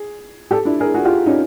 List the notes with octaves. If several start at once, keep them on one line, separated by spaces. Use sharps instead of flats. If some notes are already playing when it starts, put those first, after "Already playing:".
Already playing: G#4
G4 A4
D4 E4
G#4 A#4
F#4 G#4
F4 G4
C#4 D#4